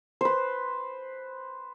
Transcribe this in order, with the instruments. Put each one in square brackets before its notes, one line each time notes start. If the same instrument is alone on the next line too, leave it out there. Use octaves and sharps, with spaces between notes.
[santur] B4 C5